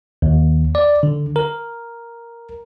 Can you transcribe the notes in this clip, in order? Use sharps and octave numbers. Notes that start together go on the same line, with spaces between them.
D#2
D5
D3
A#4